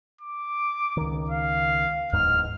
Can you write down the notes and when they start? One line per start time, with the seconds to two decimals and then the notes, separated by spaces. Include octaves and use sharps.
0.21 D6
0.97 C#2 D#3
1.30 F5
2.13 D1 E2 G#2 F6